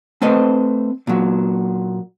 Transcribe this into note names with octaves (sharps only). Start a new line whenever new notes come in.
A3 C4 B4 C5 D#5
A#2 F#3